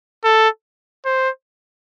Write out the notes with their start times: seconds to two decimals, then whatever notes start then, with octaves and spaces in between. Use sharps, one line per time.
0.24 A4
1.05 C5